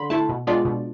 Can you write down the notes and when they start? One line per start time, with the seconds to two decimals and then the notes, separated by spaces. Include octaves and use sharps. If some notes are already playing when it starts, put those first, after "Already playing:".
Already playing: D3 B5 C6
0.10 A3 E4 A5
0.29 B2
0.47 G#3 B3 D4 F4 D5
0.65 B2